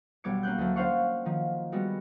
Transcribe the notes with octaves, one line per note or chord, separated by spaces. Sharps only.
B1 G3 B3 D6 G#6 C#7
A#3 C#4 F#6 G6
D2 F#3
C#4 D4 C5 F5 F#5 C#6
D#3 F3
G3 G#3 B3 F#4